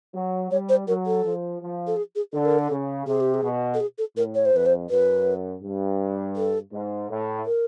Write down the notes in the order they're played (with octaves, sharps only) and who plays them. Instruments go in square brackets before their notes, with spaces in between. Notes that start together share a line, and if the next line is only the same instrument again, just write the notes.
[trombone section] F#3
[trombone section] G3 [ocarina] C#5
[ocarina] C5
[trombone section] F#3 [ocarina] A#4
[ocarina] A4
[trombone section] F3
F3
[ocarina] A4
G#4
G#4
[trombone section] D3 [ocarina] A4
[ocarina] A#4
A4
[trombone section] C#3
[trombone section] C3 [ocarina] G#4
[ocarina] G4
G#4
[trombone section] B2
[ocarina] A4
G#4
A4
[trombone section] A2 [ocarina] A#4
[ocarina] C#5
C5
[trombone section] F2 [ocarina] B4
[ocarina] C5
[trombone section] F#2 [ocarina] B4
[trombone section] G2
[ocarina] A4
[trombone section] G#2
A2
[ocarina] A#4